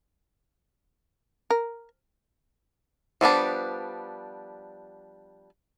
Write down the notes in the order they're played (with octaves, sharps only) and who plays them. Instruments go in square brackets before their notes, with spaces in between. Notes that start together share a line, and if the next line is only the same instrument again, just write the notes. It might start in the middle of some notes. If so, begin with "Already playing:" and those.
[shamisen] A#4
[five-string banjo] F3 G3 B3 D4